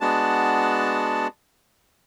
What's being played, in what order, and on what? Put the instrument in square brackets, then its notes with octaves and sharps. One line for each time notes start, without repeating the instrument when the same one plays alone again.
[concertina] G#3 B3 D4 F#4 A5